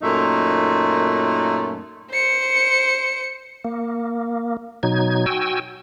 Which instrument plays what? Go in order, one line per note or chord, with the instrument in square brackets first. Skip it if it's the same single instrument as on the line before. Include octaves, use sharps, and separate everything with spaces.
[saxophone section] F#2 A#2 A3 D#4
[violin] C5 C#7
[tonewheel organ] A#3
B2 F#3 D#4 G#6
F#4 G5 G#5 E6